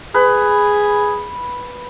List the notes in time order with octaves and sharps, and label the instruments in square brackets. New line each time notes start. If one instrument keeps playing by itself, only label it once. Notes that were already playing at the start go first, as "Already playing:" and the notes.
[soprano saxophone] G#4 [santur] B4